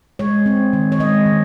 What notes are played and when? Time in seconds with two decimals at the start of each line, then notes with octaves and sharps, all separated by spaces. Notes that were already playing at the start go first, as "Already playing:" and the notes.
0.19 G#3 C#5
0.46 C4
0.73 D#3
0.92 C#5
1.00 G#3 D#5
1.26 D#3